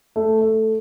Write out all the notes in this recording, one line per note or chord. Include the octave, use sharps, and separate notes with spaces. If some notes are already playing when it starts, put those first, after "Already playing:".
A3
A3